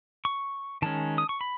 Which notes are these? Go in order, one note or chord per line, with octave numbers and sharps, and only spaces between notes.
C#6
D#3 G#3 C#4 A5
D#6
C#6
B5